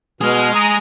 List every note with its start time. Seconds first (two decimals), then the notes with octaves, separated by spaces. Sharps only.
0.21 B2 G#3 G#4 F6
0.55 A#5 D#6